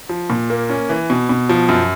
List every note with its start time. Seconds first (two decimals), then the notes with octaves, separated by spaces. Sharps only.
0.09 F3
0.30 A#2
0.50 A#3
0.70 C#4
0.89 E3
1.10 B2
1.29 B2
1.49 F3
1.69 F#2